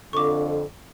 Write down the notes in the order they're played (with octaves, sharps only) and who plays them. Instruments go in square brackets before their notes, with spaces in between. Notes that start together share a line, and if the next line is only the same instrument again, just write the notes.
[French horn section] F2 D3 [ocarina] A4 [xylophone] C#6 D6